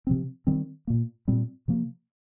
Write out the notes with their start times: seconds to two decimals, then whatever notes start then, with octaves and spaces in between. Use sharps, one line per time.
0.07 C3 F3 C4
0.47 D#3 G3 C4
0.87 A#2 A#3
1.28 A#2 G3 C4
1.68 C3 F3 A#3